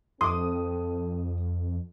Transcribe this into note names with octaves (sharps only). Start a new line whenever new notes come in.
F2 C4 A4 C6 D6 D#6